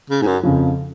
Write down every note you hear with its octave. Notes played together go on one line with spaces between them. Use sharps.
C#3
G#2
F#2
F2 C#3 F3